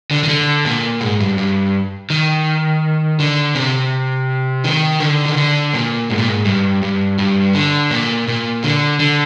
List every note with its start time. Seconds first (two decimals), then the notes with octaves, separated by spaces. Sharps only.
0.11 D3
0.23 D#3
0.28 D3
0.65 A#2
1.01 G#2
1.20 G2
1.37 G2
2.10 D#3
3.20 D3
3.55 C3
4.64 D#3
5.00 D3
5.25 D#3
5.37 D3
5.74 A#2
6.10 G#2
6.18 A#2
6.28 G#2
6.45 G2
6.82 G2
7.19 G2
7.54 D3
7.91 A#2
8.28 A#2
8.64 D3
9.00 D3